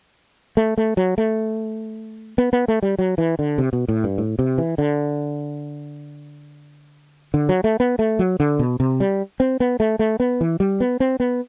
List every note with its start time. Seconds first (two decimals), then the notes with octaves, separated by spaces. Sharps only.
0.57 A3
0.78 A3
0.97 F#3
1.18 A3
2.38 B3
2.53 B3
2.68 A3
2.83 G3
2.99 F#3
3.18 E3
3.39 D3
3.58 C3
3.73 B2
3.88 A2
4.04 G2
4.18 A2
4.39 C3
4.58 E3
4.78 D3
7.34 D3
7.49 F#3
7.64 A3
7.80 B3
7.99 A3
8.19 F#3
8.40 D3
8.59 B2
8.80 C3
9.00 G3
9.40 C4
9.60 B3
9.80 A3
9.99 A3
10.20 B3
10.41 E3
10.60 G3
10.80 B3
11.00 C4
11.20 B3